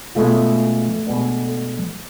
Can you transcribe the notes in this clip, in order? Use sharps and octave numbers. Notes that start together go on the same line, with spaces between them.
B2 G#3 A3 C#4 F4
B2 G#3 B3 D4